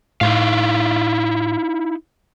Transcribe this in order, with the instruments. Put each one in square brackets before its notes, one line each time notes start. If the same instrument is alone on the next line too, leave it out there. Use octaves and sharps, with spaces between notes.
[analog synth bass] A2 [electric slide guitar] D#4 E4 F5